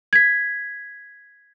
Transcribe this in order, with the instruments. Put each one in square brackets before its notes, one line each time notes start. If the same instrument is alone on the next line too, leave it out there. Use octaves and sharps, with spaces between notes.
[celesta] G#6 B6